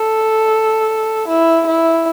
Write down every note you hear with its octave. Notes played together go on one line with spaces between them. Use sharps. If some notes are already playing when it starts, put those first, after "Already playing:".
Already playing: A4
E4
E4